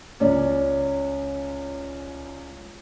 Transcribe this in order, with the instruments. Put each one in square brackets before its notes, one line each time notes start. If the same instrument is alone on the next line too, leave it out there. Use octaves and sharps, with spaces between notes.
[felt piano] C#2 C#4 C#5 D5